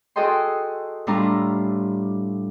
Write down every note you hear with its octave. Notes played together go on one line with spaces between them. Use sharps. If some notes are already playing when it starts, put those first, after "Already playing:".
F#4 G#4 A4 D#5 G5 C6
A2 G3 A3 D4 F4 A#5